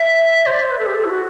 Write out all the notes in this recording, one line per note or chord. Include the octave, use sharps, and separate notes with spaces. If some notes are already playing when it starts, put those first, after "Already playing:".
Already playing: E5
C5
D5
C5
B4
A4
G4
A4
E4
F#4